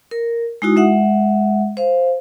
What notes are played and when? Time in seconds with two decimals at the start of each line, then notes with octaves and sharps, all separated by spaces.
0.11 A#4
0.62 G#3 D#4 E4 F#4 D#6
0.76 G#3 E5 F#5
1.77 C5 F5